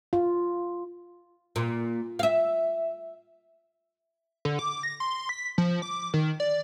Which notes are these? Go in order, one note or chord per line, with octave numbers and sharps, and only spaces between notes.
F4
A#2
E5 F5
D3
D6
A#6
C6
B6
F3
D6
D#3
D5